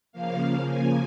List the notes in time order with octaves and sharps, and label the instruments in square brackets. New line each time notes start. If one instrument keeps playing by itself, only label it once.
[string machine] C#3 F3 A#3 F5
G#5